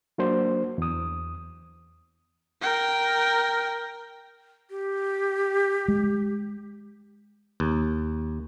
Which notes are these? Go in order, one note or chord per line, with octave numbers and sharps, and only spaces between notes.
F#3 A#3 D4 F#4 C5
E2 D#6
A#4 G5
G4
G#3
D#2